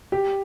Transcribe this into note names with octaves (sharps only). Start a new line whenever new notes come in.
G4